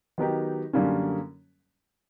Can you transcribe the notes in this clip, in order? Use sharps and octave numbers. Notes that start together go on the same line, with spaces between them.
D#3 F#3 B3 D#4 G4
F#2 D3 G3 A#3 C#4